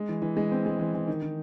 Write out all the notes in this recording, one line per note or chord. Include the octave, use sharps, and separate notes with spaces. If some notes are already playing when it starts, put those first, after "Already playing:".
Already playing: G#3
E3
E3
G#3
C4
G#3
E3
E3
D#3
D#3